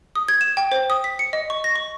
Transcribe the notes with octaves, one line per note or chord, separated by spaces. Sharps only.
D#6
G#6
E7
G5
C5
D#6
B6
C#7
D#5
C#6
A#6
C#6